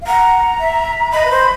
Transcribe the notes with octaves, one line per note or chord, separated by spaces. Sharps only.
F5
F#5 A#5
E5
D#5 B5
B4
C5